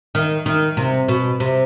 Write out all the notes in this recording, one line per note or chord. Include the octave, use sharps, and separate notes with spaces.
D#3
D#3
C3
B2
C3